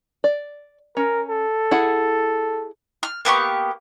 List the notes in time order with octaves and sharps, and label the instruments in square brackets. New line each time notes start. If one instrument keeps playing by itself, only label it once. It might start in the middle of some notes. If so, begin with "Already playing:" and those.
[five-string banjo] D5
[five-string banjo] C#4 [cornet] A#4
[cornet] A4
[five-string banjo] E4 G#4 F#5
[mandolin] F6
A#3 B3 G4 C#6